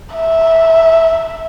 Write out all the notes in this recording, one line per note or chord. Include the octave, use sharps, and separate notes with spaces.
E5